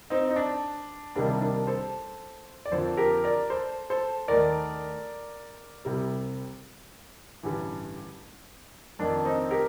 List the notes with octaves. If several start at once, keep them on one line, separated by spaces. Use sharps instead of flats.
C4 D#4
D#4
D4
C2 C3 D#3 G3 A#3 D4
D4
A4 C5
D5
F2 D3 F3 A#3 A4 C5
G4 A#4
A#4 D5
A4 C5
A4 C5
D#2 D#3 A3 A#4 D5
C2 C3 G3
A1 G2 D3 G3
F2 D#3 A3 D4
C4 D#4
G4 A#4